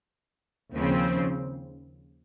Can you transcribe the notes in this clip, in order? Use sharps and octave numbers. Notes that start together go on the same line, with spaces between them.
D#2 C#3 F3 C4